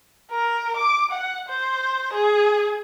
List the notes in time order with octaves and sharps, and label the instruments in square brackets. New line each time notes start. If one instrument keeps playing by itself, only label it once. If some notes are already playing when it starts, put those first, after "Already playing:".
[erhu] A#4
D6
F#5
C5
G#4